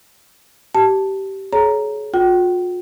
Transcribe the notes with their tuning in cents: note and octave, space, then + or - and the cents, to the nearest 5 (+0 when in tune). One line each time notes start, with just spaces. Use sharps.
G4 -20 A5 +0
G#4 +40 C#5 +0 A#5 +0
F4 +45 G5 -35